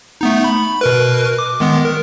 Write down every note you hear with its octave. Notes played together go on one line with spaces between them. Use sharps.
A3 B3 D#4
B5
B2 A#4 B4
D6
D#3 G#3 B3
A#4